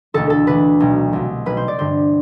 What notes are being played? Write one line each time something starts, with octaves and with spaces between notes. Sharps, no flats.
E1 D2 D3 A4
A4
D2 D3 B4
B1 B2
C2 B2
B1 B2 B4
C5
D5
G1 G2 D3 C5